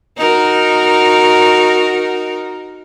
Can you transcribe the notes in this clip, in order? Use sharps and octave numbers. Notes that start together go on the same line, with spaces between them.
D#4 F#4 A#4